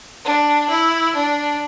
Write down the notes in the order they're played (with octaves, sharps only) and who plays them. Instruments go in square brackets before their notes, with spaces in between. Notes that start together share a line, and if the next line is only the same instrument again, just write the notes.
[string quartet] D4
E4
D4